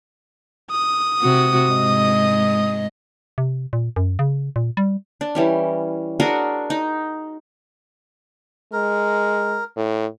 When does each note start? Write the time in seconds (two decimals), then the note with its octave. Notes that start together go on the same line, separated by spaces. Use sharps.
0.71 D#6
1.22 C3 F#4
1.71 G#2 D#5
3.38 C3
3.73 A#2
3.96 F#2
4.19 C#3
4.56 A#2
4.77 G3
5.21 D4
5.35 E3 G3 C#4
6.20 D4 F#4 G#4 A#4
6.70 D#4
8.73 G#3 A#4
9.77 A2